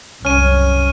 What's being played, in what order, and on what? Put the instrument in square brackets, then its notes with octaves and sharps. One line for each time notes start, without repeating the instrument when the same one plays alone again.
[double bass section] C2 F#2 [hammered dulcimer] C#4 [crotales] F6 D#7